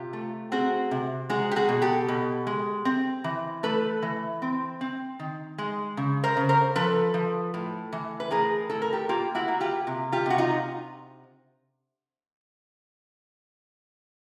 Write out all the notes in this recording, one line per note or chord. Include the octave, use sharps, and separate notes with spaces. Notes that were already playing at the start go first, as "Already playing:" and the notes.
Already playing: C3 F4 G4
A3
C4 F#4 G#4
C3
G#3 F#4 G#4
G4
F#4 G#4
B2
G4 A4
B2
G#3
C4
E3
A3 A4 B4
E3
C4
C4
D#3
G#3
C#3
A#4 C5
C#3
A#4 C5
F3 A4 B4
F3
A2
E3
B4
A2 G#4 A#4
A2 A4
A#4
G4 A4
A#3 F4 G4
E4 F#4
A#3
F4 G4
C3
F4 G4
C3 F#4
D#4 F4